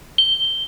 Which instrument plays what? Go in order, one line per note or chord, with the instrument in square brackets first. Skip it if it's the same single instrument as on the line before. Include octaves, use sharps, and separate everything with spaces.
[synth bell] G7